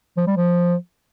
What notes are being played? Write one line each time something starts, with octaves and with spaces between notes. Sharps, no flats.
F3
G3
F3